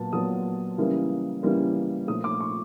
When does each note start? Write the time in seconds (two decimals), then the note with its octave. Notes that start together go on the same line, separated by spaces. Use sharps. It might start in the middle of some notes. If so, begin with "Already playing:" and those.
Already playing: A#2 F#3 B3 A5
0.13 A#2 F#3 B3 D#6
0.78 C#3 E3 G3 A#3
1.43 C#3 E3 G3 A#3
2.07 A#2 F3 A3 D#6
2.24 D6
2.40 C#6